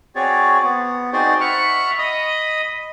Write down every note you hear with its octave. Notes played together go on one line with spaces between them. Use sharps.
C4 F#4 G#4 C#5 D5
B3
C4 D#4 F#4 G#4 C5 D5
E5 F#5 B5 C#6 F6 F#6
D#5 B5 D#6